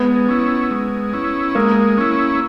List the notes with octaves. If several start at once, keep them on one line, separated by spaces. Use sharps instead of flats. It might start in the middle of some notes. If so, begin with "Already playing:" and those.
Already playing: G#3 B3
C#4 E4
G#3
C#4 E4
G#3 A#3
C#4 E4